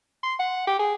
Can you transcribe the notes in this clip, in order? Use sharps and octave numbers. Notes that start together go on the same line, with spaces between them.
C6
F#5
G4
G#4